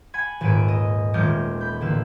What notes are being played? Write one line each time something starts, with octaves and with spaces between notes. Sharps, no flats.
F#5 G#5 B5 G#6
D#1 G#2 B4 G#5 E6 D7
D#5
D#1 G#3 A3 D6 F6 G6
B5 G6
A1 D3 A#3 B4 E6